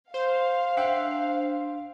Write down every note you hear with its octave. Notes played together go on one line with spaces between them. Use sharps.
C5 F5
D4 E5 F#5 G5